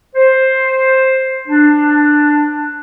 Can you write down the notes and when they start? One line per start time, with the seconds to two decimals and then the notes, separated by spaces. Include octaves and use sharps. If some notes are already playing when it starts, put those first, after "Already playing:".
0.15 C5
1.48 D4